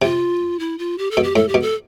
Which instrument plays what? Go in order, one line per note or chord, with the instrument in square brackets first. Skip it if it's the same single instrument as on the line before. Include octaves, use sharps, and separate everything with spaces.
[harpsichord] C3 [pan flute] F4
[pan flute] E4
F4
G4
A4
[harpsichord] B2
[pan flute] G4
[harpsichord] A2 [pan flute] A4
[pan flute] G4
[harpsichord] B2
[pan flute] A4